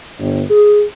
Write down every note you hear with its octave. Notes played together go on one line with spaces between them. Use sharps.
G1
G#4